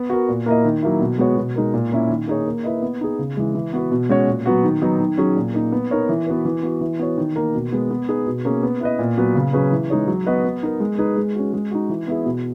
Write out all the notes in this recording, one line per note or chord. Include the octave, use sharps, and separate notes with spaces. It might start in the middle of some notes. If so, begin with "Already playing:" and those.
Already playing: B3
F#4 A#4
A#2
A#3 E4 A#4 D#5
D#3
F#3 A#3 E4
B2
G#3 B3 F#4 C#5
B2
G#3 D#4 A#4
A#2
A#3 C#4 E4
D#3
A#3 D#4 G#4 C#5
A#3
E4 B4 D#5
B3
D#4 G#4
C#3
E3 G#3
E3
B3 F#4 B4
B2
G#3 C#4 F#4 C#5
A#2
F#3 B3 F#4
D#3
F#3 B3 D#4
D#3
F#3 C#4 G#4
A#2
A#3 D#4
B3
D#4 A#4 C#5
E3
B3 F#4 B4
E3
B3 F#4
E3
B3 F#4 C#5
D#3
A#3 D#4 A#4
B2
G#3 B3
B3
D#4 G#4 B4
B2
A#3 C#4 G#4
B3
E4 B4 D#5
A#2
F#3 B3 F#4 B4
C#3
F#3 C#4 G#4 B4
E3
G#3 D#4 G#4 C#5
F#3
B3 F#4 B4 D#5
B3
D#4 A#4
G#3
D#4 G#4 B4
G#3
C#4 F#4
G#3
D#4 F#4
E3
B3 E4 G#4
B2